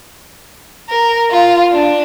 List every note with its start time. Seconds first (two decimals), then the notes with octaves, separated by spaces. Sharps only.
0.89 A#4
1.31 F4
1.72 D4